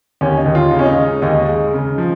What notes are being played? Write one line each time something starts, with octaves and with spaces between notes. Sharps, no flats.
D#2 C#4
D#4
D#2
F4
C#3 D#4
C#4
D#4
G#3
D#2 D#4
G#3
C#3
F3